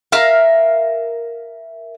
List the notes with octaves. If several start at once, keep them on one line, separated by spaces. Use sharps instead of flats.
A#4 E5 F5